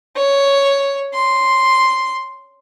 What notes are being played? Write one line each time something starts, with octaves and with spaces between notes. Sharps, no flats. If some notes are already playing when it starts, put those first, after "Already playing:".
C#5
C6